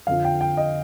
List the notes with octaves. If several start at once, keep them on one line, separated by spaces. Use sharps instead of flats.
F2 D3 F3 F5
G5
G5
D#5